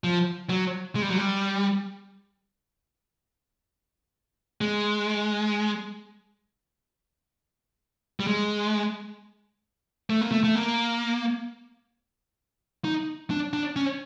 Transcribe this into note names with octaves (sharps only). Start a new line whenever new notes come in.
F3
F#3
G#3
G3
F#3
G3
G#3
G3
G#3
A3
A#3
A3
A3
A#3
D#4
D4
D4
C#4